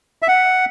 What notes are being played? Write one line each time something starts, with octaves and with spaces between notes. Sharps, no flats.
E5
F#5